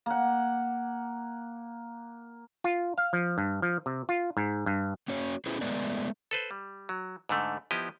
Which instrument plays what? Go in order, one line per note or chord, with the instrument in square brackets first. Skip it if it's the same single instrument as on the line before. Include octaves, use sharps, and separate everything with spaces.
[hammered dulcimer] A#3 F#5
[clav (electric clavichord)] F4
F5
F3
G2
F3
C3
F4
G#2
G2
[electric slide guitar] A#3 C#4 F#4 C#5
C#4 E4 G#4 A4 B4 C5
G#3 A3 B3 B4 D5
[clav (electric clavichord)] A4 B4 C5
G3
F#3
G#2 D3 A3
F3 B3 E4 G4 D#5